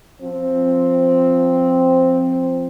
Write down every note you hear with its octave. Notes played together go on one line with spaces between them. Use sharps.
F3 C4